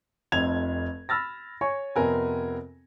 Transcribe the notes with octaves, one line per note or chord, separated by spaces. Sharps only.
F1 F2 C4 G#6 F7
B5 E6 F6 A6 A#6
C#5 G#5 C#6
F2 C3 B3 C4 A#4 G#5